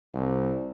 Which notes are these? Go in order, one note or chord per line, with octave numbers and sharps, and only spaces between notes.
C2